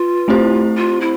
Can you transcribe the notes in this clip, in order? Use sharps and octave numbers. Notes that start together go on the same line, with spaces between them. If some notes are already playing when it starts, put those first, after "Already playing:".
Already playing: F4 B4
A3 C4 E4 G4 C5
F4
E4